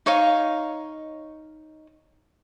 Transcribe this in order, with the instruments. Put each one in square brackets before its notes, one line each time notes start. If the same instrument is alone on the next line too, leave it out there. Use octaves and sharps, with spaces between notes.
[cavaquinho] D#4 C#5 D#5 F5